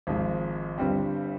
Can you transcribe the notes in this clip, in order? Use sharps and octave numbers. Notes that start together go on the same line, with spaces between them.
G#1 G#2 F3
G1 G2 G3 C4